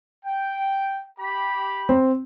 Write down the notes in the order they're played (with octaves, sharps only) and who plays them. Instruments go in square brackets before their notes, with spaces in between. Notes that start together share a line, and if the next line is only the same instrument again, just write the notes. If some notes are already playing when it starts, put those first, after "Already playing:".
[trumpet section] G5
G4 B5
[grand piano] C4